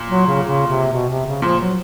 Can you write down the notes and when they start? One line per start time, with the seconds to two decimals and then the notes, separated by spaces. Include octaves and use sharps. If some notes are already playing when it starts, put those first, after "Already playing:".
Already playing: A#2
0.09 F#3
0.27 C#3
0.43 C#3
0.67 C3
0.92 B2
1.09 C3
1.26 C#3
1.42 A#2 F3
1.60 F#3